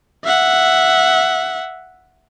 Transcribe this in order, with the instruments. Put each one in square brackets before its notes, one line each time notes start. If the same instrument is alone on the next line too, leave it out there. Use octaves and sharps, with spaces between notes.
[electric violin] E5 F#5